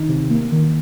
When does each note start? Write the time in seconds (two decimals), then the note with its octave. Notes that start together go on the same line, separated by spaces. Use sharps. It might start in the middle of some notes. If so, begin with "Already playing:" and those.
Already playing: D#3 D#4
0.09 C3
0.30 A#3
0.52 D#3